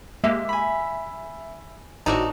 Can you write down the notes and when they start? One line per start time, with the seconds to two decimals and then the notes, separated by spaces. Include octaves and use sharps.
0.24 G#3 A#3 G4 E5
0.49 G#5 B5
2.06 G#1 A2 C3 D4 D#4 F#4